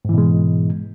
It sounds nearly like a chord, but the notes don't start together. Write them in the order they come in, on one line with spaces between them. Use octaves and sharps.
G#2 E3 B2 G#3